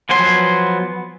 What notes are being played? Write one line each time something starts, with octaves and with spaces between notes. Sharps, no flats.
F3 F#3 B3 G#5 C6